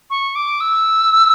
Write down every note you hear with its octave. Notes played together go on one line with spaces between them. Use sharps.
C#6
D6
E6